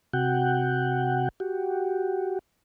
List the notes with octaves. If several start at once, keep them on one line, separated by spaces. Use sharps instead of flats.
C3 F#4 F#5 G5
F#4 G4